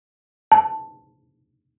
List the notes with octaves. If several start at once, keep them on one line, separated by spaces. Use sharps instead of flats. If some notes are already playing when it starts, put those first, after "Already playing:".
A5